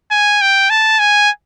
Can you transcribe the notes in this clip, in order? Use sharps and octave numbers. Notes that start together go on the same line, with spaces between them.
G#5
G5
A5
G#5